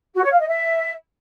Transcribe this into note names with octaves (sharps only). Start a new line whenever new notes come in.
F#4
C#5
F5
D#5
E5